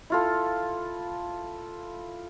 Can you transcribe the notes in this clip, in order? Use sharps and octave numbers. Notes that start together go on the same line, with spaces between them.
E4 F4 A4